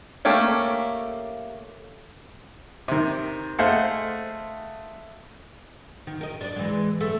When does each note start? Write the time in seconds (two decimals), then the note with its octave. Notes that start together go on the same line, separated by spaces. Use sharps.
0.25 A3 A#3 C#4 G4 A4
2.88 C3 D#3
3.59 A3 G#4 C5 D#5 F5 F#5
6.07 D#3
6.21 A#4 D#5
6.41 D4 D5
6.56 E3 G#3
7.01 A3